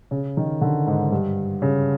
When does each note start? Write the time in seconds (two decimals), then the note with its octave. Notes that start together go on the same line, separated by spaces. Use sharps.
0.11 C#3
0.37 D#3
0.61 D3
0.87 G#2
1.12 G2
1.62 C#3